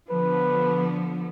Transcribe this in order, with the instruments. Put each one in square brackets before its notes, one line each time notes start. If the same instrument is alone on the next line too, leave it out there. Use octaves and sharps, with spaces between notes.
[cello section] D3 F3 B3 [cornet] B4